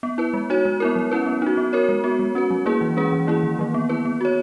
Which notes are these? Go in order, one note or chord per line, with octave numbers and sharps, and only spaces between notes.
B3
E4 B4
G#3
D#4 F#4 C#5
G#3
B3 E4 A#4
F#3
C#4 E4 B4
B3
D#4 F#4
B3
F#4 A#4 C#5
G#3
B3 F#4
G#3
C#4 F#4 B4
F#3
A#3 E4 G#4 B4
E3
G#3 C#4 G#4 B4
E3
A#3 E4 G#4
D#3
F#3 A#3
B3
E4 B4
B3
F#4 C#5